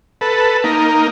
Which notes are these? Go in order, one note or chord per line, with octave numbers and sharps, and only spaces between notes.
A4 B4
A#3 D#4